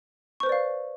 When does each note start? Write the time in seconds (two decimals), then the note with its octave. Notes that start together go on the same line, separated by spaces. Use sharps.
0.40 C#6
0.43 C5
0.46 B4
0.49 D5
0.52 F5